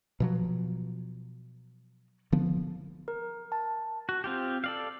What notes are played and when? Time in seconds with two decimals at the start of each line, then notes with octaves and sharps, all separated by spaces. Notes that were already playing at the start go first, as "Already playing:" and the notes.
0.20 B2 F3 F#3
2.32 D3 F3 B3
3.08 A#4
3.52 A5
4.09 F#4
4.24 C4 F4 G4
4.64 A4 D5 F5